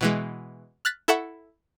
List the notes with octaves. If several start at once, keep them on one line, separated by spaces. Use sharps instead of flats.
B2 E3 G#3
F6 F#6 A6 B6
E4 A4 E5 F#5 C#6